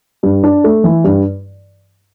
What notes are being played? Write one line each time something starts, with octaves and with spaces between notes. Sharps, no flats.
G2
D4
A3
E3
G2